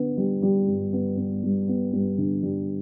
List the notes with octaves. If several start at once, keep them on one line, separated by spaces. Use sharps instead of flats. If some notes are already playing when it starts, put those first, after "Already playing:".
Already playing: D3 B3
G3
G3
G2
B3
B3
G2
B3
G2
D3
G3